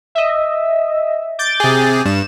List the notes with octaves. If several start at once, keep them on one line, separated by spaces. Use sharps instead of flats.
D#5 E5
D6 G6 A6
C3 G#4
G2 E7